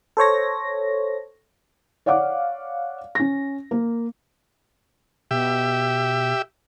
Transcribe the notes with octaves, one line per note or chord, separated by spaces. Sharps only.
A4 C5 C#5 A#6
C#5 D5 F5 F#5 D6
C#4 A#6
A#3
B2 G4 E5